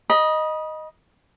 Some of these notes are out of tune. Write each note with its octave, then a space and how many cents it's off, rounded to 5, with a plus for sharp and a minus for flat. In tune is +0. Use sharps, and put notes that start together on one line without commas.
D#5 +0 B5 -35